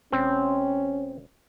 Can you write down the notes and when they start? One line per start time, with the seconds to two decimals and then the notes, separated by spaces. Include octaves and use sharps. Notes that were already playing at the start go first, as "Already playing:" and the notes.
0.12 E1 C4 C#4